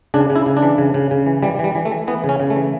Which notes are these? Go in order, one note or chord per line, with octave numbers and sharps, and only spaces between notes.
C#3 D4
C#3
E4
C#3
D4
E3
C#3
C#3
C#3
E3
E3 G3
E3
G3
E3
A3
E3
E3 B3
C#3
C#4
C#3
A3
E3